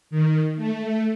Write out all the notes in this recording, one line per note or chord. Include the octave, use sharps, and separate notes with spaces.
D#3
A3